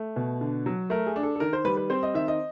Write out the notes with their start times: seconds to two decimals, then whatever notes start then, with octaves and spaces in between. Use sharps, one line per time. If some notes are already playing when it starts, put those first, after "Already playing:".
Already playing: A3
0.16 B2
0.41 D3
0.66 F#3
0.90 A3 A#4
1.07 G#4
1.16 D4
1.23 A4
1.36 A4
1.40 D#3 A#4
1.53 C5
1.65 G3 B4
1.77 B4
1.90 C4 C5
2.03 D#5
2.15 D#3 E5
2.28 D#5